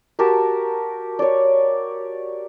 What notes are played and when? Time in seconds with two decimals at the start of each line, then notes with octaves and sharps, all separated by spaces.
0.19 F#4 G4 A#4 A5
1.19 C#5 D5